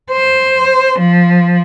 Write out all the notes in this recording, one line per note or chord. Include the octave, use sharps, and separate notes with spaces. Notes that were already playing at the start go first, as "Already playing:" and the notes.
C5
F3